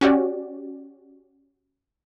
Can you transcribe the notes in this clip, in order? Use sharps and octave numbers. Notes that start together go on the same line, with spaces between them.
C#4 F#4 G4 D5